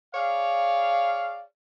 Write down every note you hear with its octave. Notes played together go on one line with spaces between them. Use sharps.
G#4 C#5 D5 F5